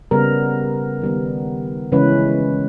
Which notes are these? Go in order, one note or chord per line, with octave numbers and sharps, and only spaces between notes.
C#3 G3 B3 A#4
D#3 G3 B3
C#3 E3 G#3 C#4 B4